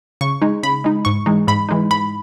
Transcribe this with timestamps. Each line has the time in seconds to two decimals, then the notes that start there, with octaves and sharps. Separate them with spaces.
0.21 C#3 C#6
0.42 G#3 D#4
0.63 C#3 B5
0.84 G#3 D#4
1.05 G#2 C#6
1.26 E3 G#3 D#4
1.48 G#2 B5
1.69 E3 G#3 D#4
1.91 G#2 B5